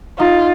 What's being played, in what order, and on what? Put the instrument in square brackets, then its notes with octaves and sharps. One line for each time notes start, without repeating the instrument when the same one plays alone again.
[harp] D#4 [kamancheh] F4